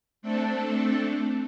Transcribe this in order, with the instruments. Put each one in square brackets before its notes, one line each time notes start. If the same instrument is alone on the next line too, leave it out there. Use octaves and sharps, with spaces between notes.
[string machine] A3 C4 D4 A4